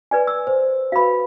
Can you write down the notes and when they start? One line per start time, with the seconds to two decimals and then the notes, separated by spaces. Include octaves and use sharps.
0.11 B4 D5 G#5
0.27 E6
0.47 C5
0.92 F#4 B4 F5 B5